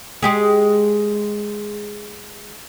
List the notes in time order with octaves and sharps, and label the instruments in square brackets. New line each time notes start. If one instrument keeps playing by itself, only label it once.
[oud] G#3 G4 G#4